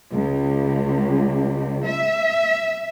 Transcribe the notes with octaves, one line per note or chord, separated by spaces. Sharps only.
C#2
E5